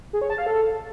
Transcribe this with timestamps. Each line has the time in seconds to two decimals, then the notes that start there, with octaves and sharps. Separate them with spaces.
0.13 G#4
0.22 C#5
0.30 A5
0.38 F5
0.47 A4